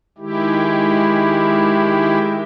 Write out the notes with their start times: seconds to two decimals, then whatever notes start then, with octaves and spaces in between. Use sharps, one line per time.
0.18 D#3 G#3 E4 G4